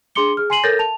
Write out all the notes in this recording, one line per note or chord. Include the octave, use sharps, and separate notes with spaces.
D4 G#4 C6 D6 C#7 G7
G#4 F6
G#5 C6 C7 D#7 F#7
A4 A#4 C#5 G6 A6 A#6
A5 F7